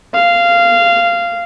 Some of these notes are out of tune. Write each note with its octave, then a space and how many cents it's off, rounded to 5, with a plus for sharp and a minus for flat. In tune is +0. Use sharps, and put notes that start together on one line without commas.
F5 -15